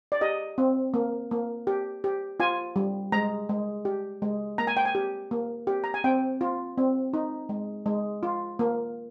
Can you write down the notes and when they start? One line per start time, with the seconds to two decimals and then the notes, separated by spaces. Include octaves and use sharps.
0.12 D5
0.21 G4 D#5
0.58 C4
0.94 A#3
1.31 A#3
1.67 G4
2.04 G4
2.40 F4 G#5
2.76 G3
3.12 G#3 A#5
3.49 G#3
3.85 G4
4.22 G#3
4.58 A#3 A#5
4.67 G#5
4.77 G5
4.85 G#5
4.95 G4
5.31 A#3
5.67 G4
5.84 A#5
5.94 G#5
6.04 C4 G5
6.41 F4
6.78 C4
7.13 D#4
7.49 G#3
7.86 G#3
8.23 F4
8.59 A#3